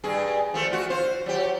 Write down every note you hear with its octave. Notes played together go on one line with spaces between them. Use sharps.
G2 G#4
F3 A3
F4 F#4
F4 C5
F#3 G4